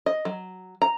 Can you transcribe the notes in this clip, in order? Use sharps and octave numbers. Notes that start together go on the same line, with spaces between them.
D#5
F#3
A#5